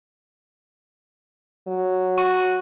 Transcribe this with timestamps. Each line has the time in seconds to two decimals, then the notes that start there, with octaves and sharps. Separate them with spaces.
1.67 F#3
2.18 F#4 C#6